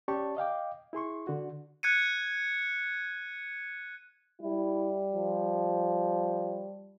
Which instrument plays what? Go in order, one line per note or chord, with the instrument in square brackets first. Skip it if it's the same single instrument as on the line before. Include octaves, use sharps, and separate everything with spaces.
[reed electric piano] C#4 G4 D5 A5 C#6
D#5 F5 G5 D6
E4 G#4 C6 C#6
D3 F#4
[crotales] F#6 G#6 C#7 D#7
[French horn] G3 [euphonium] E4
[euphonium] F3